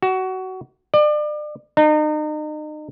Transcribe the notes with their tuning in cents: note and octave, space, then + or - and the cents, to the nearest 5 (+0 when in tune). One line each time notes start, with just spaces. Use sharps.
F#4 +20
D5 +35
D#4 -35